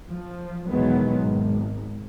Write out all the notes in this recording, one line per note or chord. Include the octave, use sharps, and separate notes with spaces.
F3
E2 B2 D#3 F#3 G#3 B3
G#1